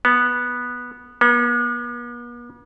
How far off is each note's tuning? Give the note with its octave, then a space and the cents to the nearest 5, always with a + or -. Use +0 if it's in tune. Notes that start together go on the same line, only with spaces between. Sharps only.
B3 -10
B3 -45